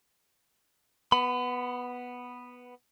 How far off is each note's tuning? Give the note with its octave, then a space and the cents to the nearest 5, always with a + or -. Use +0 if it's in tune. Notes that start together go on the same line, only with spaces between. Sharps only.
B3 +0 B5 +30